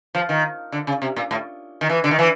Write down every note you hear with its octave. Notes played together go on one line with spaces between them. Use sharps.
F3
D#3
D3
C#3
C3
A#2
A2
D#3
E3
D3
D#3
E3